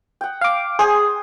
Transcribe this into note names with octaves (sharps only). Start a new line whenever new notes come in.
F#5 G5
F5 D6
G#4 C5 G#5 D#6